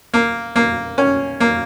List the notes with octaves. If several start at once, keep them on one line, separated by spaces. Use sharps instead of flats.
A#3
A#3
C#4
A#3